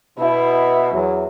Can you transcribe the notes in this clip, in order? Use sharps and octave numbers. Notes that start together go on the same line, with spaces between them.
B2 E4
E2 F#3